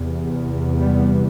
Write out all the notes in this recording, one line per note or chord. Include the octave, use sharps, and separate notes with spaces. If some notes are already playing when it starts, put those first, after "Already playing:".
Already playing: E2 C3
G3 B3